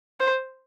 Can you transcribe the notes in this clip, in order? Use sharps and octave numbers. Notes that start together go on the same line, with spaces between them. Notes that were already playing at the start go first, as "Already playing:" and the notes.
C5